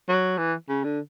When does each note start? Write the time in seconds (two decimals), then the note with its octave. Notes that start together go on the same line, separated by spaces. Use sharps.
0.09 F#3
0.38 E3
0.68 C#3
0.84 D3